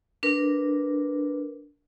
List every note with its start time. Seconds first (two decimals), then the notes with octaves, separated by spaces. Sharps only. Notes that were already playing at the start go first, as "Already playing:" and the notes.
0.23 D4 A#4 B4